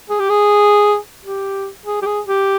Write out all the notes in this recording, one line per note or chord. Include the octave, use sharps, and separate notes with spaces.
G#4
G4
G#4
G4
G#4
G4
G#4
G4